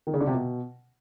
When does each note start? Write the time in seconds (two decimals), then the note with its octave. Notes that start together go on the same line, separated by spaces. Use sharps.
0.07 D#3
0.14 C#3
0.20 D3
0.27 C3
0.34 B2